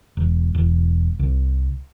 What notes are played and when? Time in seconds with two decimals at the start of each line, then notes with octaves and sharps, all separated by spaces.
0.17 E1
0.54 E1
1.19 C2